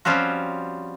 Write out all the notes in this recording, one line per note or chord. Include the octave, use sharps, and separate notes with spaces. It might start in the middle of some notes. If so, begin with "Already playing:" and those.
F3 G3 C4 C#4 F#4